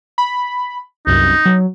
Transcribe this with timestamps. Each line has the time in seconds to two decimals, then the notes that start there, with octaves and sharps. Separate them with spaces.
0.18 B5
1.07 C2 F#2 D#4
1.46 F#3